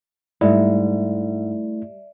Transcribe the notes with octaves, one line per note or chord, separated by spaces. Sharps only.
G#2 G3 A3 E4 D5 E5